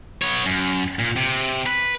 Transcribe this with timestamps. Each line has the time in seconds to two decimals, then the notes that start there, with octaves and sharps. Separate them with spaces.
0.22 B3 C#5
0.46 F#2
0.99 A#2
1.16 C3
1.66 B4